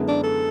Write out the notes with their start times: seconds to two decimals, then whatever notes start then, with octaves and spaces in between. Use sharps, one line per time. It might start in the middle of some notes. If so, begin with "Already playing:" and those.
Already playing: F#2 D3 G#3 B3 E4
0.08 D4
0.23 A4